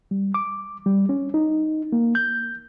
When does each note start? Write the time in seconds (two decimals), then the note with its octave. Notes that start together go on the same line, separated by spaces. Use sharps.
0.11 G3
0.34 D6
0.86 G3
1.09 C#4
1.34 D#4
1.93 A#3
2.15 G6